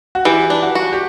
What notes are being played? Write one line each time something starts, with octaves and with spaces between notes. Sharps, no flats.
F#4
E3 G4
D4
F#4
F#4
G4